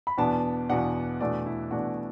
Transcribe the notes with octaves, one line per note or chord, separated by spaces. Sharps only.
B5
E2 B2 B3 D4 A5
E2 B2 B3 D4 F#5
E2 B2 A3 D4 D5
E4
E2 B2 A3 D4 F#4